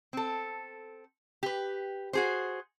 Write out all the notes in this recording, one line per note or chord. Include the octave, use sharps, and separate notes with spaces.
C4 A4
G4 B4
F#4 G#4 C5